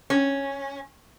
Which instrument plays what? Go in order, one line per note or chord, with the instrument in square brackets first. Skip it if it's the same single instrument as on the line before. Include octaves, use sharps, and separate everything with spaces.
[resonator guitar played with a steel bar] C#4